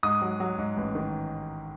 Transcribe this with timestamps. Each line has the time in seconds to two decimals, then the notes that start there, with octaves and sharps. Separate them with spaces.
0.03 G#2 D#6
0.22 F#3
0.40 F#3
0.58 G#2
0.77 A1
0.95 D#3